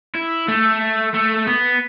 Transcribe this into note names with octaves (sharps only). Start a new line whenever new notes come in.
E4
A3
A3
B3